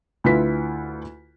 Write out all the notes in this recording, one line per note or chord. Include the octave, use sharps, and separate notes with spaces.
D2 E4 F4 B4 B6